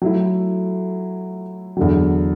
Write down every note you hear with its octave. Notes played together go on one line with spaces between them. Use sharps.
F#3 A3 E4
E2 D3 F#3